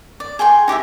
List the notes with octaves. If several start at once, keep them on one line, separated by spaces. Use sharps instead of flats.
D5
G#4 G5 G#5 C6
D#4 G4 D5 E5